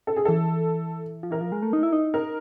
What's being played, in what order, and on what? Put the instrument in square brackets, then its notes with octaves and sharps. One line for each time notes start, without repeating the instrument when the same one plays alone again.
[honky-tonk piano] A4
G#4
[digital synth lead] E3 [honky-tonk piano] A4
[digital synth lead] F3
[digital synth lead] E3 [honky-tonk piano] A#4
[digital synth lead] F3
G#3
A3
D#4
E4
D#4
[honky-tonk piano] A#4